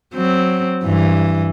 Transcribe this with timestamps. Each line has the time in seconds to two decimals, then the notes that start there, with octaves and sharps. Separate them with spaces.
0.14 F#3 C4
0.83 G2 E3